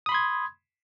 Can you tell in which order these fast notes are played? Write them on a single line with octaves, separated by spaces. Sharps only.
D#6 B5 C6 G#6